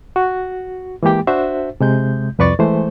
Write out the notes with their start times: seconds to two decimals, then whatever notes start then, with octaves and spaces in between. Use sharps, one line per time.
0.16 F#4
1.03 E3 G#3 A#3 G4 G5
1.27 D4 F#4 C5 E5
1.81 C3 G#3 G6
2.39 C2 F2 B4 D5 C#6 A6
2.59 E3 G#3 A3 C5